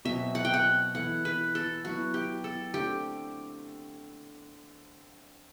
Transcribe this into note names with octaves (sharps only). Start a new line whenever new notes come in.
B2 F#3 C4 F#4 E5
F#5
G5
F#5
E3 B3 E4 A4 F#5
B4
A4
F#3 B3 E4 F#4
G4
A4
D3 A3 C4 G4